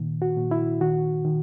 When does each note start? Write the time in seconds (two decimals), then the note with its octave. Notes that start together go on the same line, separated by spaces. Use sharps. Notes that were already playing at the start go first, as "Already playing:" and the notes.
Already playing: A#2 D#3
0.22 F#4
0.36 A#2
0.51 E4
0.81 D#3 F#4
1.25 D#3